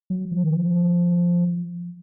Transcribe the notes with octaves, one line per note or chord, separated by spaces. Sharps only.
F#3
F3
D#3
F3